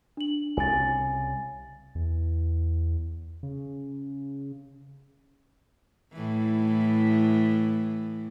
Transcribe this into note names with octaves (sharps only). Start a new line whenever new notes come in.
D4 F#7
C2 C#3 G#5 A6
E2
C#3
A2 E3